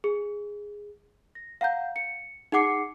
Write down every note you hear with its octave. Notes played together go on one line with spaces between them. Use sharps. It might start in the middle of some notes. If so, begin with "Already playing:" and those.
G#4
A#6
F5 F#5 A#5 G6
C#7
D#4 G#4 F#5 D6 C7 C#7